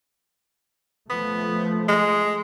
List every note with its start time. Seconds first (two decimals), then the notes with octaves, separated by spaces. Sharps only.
1.10 F3 A3 B3
1.88 G#3